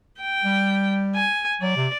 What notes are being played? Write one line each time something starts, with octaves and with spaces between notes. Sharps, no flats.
G5
G3
G#5
F#3 D5
C3